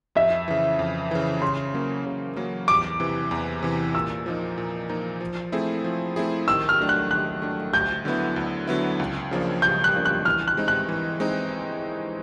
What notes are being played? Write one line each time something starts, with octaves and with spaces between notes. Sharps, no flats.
F2 E5
C#3 E3
F2
C#3 E3
C#3 C6
F#3 A#3 C#4
C#3
F#3 A#3 C#4
E2 D6
C3 E3
E2
C3 E3
A#2 E6
F3 A#3 D#4
A#2
F3 A#3 D#4
F3
A3 C4 E4 G#4
F3
A3 C4 E4 G#4
D#3 E6
F6
F#3 A3 D4
F#6
D#3 F#6
F#3 A3 D4
D2 G6
D3 F#3 B3 E4
D2
D3 F#3 B3 E4
C#2
C#3 F3 A#3 D4
C#2 G6
F#6
C#3 F3 A#3 D4
F#6
E3 F6
F#6
G#3 C4 D#4
F#6
E3
G#3 C4 D#4